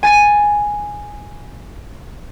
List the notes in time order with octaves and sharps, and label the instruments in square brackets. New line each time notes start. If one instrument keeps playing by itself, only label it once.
[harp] G#5 A6 D#7